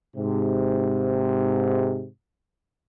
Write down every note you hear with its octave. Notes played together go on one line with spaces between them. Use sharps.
G#2 C3